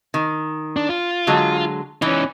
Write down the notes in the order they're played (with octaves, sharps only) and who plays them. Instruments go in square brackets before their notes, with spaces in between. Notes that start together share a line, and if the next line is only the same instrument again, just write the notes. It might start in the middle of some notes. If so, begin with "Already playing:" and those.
[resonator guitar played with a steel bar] D#3
[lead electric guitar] D4
F4
[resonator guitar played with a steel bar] D3 F#3 G#3
[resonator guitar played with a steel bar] E3 [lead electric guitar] C#4 D#4